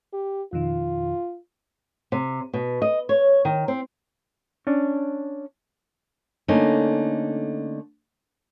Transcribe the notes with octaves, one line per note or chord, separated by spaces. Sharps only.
G4
F2 B2 D#3 F4
C3
B2
D#5
C#5
D#3
C4
C#4 D4
D3 A3 A#3 C#4 D#4